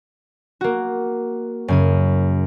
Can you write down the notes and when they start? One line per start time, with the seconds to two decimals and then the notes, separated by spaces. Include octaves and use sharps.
0.61 A#3 F#4
1.68 F#2 C#3 D#7